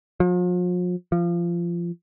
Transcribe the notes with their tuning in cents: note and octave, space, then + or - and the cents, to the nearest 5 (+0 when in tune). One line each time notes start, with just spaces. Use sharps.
F3 +40
F3 -20